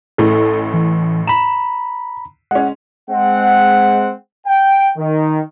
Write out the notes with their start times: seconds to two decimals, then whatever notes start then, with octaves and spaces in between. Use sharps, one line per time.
0.18 A1 A2 A3 A4
0.74 E3
1.27 A#5 B5 E7
2.51 G#3 C#4 F#5
3.10 G#3 C4 F#5
4.47 G5
4.98 D#3